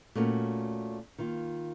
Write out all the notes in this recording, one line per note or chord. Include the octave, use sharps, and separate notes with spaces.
A#2 A3 C#4 F#4 A#4
D#3 A#3 F4